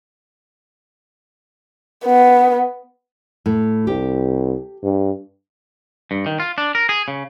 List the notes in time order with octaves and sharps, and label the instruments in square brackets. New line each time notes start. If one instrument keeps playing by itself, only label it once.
[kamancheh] B3
[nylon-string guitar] A2
[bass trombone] C2 [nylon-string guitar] G4
[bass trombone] G2
[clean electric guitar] G2
D#3
F4
D4
A#4
G#4
C#3